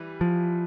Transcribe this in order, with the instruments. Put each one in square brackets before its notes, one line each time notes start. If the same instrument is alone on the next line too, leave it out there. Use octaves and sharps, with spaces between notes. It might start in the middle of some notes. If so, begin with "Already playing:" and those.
Already playing: [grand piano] E3 G3
[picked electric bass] F3